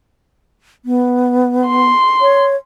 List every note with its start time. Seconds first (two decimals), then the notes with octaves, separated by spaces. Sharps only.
0.85 B3
1.66 C6
2.21 C#5